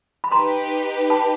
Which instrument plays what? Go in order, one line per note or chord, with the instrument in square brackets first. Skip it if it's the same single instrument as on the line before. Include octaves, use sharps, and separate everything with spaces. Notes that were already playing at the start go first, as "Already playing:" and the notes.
[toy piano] B5
[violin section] D#4 G4 B4 [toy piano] A#5 C6
[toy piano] A5 B5